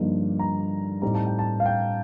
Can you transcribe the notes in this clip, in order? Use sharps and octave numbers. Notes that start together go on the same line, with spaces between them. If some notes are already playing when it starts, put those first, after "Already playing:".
Already playing: G2 D3 F3 A#3 D#4
A#5
A2 G3 C4 D#4 A#5
A5
G5
A5
F5
G5